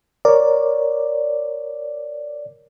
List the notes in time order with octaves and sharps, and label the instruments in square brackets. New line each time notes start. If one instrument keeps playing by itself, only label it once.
[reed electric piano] A#4 C#5 [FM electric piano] D5